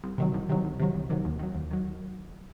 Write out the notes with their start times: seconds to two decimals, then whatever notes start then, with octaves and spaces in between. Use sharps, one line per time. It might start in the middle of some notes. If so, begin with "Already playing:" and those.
0.04 C2
0.18 C3 D#3 F#3
0.34 C2
0.49 C3 D#3 F#3
0.64 C2
0.79 C3 D#3 F#3
0.94 C2
1.10 C3 D#3 F#3
1.25 D#2
1.39 D#3 F#3
1.54 D#2
1.71 D#3 F#3